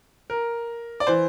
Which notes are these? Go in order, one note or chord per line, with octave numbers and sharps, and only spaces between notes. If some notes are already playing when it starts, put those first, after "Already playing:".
A#4
D5
E3 C5